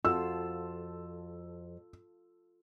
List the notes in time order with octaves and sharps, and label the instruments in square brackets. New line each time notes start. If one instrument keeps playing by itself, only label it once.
[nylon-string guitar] F2 F#4 [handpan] F4 A4 [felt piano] E6